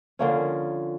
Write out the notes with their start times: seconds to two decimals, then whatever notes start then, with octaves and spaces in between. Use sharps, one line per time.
0.19 D3 F3 A#3 C#4